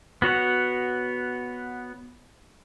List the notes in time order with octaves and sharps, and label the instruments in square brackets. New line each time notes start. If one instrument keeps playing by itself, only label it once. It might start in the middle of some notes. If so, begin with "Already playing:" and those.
[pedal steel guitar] B3 F#4 C#5 F#5